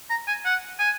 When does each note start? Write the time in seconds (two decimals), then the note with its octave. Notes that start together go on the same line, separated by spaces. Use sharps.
0.10 A#5
0.27 G#5
0.45 F#5
0.79 G#5